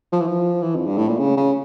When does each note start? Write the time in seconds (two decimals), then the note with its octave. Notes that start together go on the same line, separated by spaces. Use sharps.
0.13 F3
0.20 E3
0.27 F3
0.62 E3
0.76 F2
0.86 G2
0.98 A2
1.08 A#2
1.19 C#3
1.37 C#3